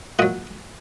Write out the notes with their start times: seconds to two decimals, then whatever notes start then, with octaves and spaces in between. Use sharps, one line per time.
0.19 A#2 F#3 D#5 F#5